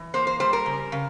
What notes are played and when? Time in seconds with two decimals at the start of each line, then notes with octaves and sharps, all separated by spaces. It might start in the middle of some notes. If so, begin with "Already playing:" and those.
Already playing: E3
0.14 A#3 C5
0.27 C5
0.40 G3 C5
0.53 A#4
0.66 C#3
0.92 C#3